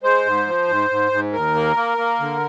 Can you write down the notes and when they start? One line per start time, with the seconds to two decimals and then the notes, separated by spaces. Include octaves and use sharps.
0.03 G#3 C5
0.25 G#2
0.47 F3
0.68 G#2
0.90 G#2
1.12 G#2
1.33 D#2 A#4
1.55 A#3
1.76 A#3
1.98 A#3
2.20 D3